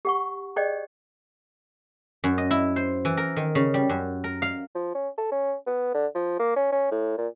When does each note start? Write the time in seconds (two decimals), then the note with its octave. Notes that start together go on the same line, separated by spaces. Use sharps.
0.05 G4 F#5 C#6
0.56 G#4 C5 D5 D#5 G5
2.24 F#2
2.38 D#5
2.51 E4
2.76 C5
3.05 E3
3.17 A#4
3.36 D#3
3.55 C#3
3.74 G3
3.89 F#2
4.24 A#4
4.42 F5
4.75 F3
4.95 C#4
5.18 A4
5.32 C#4
5.67 B3
5.95 D3
6.15 F3
6.40 A#3
6.56 C#4
6.72 C#4
6.91 A2
7.18 A#2